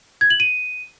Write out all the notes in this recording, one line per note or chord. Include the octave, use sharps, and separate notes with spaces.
G#6
F#7
D#7